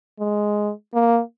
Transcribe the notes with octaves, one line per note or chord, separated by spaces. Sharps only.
G#3
A#3